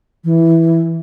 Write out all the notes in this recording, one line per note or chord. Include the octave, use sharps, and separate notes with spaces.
E3